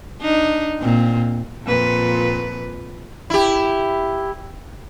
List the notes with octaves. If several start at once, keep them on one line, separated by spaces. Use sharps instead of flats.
D4 D#4
A#2 C4
F2 A#2 B4
E4 G4